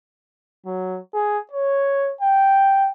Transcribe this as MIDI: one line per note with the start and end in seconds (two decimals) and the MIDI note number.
0.66 0.99 54
1.14 1.39 68
1.51 2.11 73
2.21 2.91 79